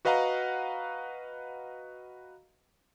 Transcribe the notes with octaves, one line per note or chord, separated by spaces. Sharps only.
F#4 B4 D#5 F5 F#5 A#5